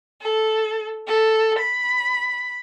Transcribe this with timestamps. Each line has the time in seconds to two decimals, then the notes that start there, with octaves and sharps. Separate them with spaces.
0.21 A4
1.07 A4
1.59 B5